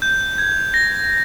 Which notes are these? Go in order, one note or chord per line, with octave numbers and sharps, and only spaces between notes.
G6
G#6
A#6